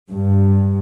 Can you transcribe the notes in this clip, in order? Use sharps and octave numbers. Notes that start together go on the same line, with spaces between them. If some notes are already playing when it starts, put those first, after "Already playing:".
G2